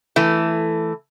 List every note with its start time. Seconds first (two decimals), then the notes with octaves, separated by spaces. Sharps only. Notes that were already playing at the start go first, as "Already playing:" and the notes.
0.16 E3 A3